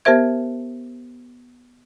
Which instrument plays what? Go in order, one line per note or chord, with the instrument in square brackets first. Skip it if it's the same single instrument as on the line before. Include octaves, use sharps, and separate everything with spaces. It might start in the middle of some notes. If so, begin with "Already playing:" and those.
[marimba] B3 G4 A#4 C5 E5 G#6